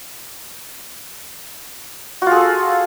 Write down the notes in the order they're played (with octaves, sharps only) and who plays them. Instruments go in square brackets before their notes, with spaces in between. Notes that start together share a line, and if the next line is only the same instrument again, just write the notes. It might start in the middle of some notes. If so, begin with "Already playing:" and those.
[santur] F#4
F4
G#4
A4